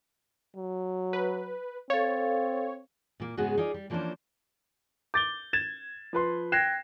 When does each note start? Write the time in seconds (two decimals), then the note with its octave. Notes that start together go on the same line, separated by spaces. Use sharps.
0.57 F#3
1.13 B4
1.90 C4 A4 C#5 F5
3.20 A#2 A#3
3.37 G#2 C#3 G#3 B3 F#4 G#4
3.58 D#4 F4 G#4 D5
3.74 G3
3.90 E3 F3 A#3 C#4 D4 C5
5.14 D6 G6 A6 G7
5.53 G#6 A6 E7
6.13 F3 B4 C6
6.52 G5 F#6 G#6 A#6 C7 E7